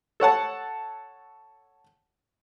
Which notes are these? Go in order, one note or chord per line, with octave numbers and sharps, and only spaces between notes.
A4 C#5 F#5 A5